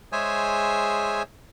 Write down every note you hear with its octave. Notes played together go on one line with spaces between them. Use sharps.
G#3 G#4 C5 C#5 E5 G#5